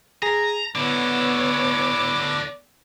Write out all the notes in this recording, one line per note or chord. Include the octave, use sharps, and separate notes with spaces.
G#4 A#5
D3 B3 E4 C#5 D6